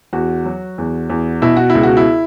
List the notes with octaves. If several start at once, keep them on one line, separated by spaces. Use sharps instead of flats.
E2 F#4
F#3
E2
E2
B2 E4
F#4
E4
C#2
F#4
E4